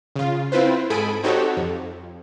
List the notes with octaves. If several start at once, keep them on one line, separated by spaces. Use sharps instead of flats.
C#3 F4
C4 E4 F4 B4 C5
G#2 A4 G#5 B5 D#6 D7
C4 D#4 F#4 G4 A4 C#5
F2